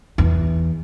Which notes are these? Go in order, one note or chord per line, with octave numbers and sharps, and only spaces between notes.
E2